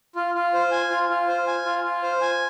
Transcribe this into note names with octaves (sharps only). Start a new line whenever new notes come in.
F4
F4
C5
G#5
F4
F4
C5
G#5
F4
F4
C5
G#5